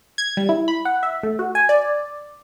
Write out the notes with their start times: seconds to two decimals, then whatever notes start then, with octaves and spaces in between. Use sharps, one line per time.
0.18 G#6
0.37 G3
0.49 E4
0.68 B5
0.85 F#5
1.03 E5
1.23 A3
1.39 F#4
1.55 G#5
1.69 D5